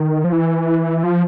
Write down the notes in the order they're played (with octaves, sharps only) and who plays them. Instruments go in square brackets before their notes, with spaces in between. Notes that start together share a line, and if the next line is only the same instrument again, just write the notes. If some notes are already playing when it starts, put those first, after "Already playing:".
Already playing: [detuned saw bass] D#3
F3
E3
F3